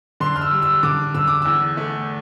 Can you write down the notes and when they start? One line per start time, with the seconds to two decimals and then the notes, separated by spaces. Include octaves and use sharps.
0.20 D3 C6
0.36 F6
0.41 E6
0.51 G3
0.62 E6
0.83 D3 D6
1.14 D3 E6
1.27 D6
1.42 E2 E6
1.77 A3